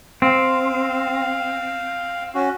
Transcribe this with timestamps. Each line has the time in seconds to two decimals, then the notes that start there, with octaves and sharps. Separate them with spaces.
0.22 C4 F5
2.35 C#4 F#4